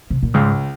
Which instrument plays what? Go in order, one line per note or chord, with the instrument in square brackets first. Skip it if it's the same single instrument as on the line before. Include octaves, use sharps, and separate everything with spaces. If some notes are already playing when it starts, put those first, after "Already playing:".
[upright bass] C3
A#2
[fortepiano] C#2 [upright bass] G#2